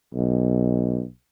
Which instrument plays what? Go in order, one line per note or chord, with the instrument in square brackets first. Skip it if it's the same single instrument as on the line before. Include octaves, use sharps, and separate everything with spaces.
[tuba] B1